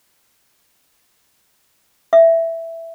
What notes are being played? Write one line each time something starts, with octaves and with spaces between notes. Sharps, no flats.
E5